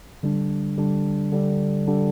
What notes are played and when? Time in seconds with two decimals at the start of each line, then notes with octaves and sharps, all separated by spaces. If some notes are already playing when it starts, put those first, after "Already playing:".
0.23 D3 G3 D4
0.78 D3 G3 D4
1.32 D3 G3 D4
1.87 D3 G3 D4